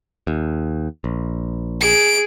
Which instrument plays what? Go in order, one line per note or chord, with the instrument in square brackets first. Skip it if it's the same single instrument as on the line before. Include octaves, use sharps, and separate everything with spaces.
[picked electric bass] D#2
A#1
[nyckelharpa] G#4 [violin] D7